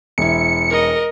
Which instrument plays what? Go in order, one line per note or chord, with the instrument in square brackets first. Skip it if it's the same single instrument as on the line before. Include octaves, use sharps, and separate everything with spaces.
[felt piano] E1 E4 [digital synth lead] C#7
[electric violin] A#4 D#5